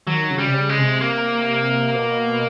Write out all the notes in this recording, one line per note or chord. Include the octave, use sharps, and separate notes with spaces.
D#3 F#3
C#3
G3
C3
C#3
G#3
C3
A#3
B2